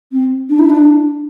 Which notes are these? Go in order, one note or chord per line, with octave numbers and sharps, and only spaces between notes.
C4
D4
E4
D4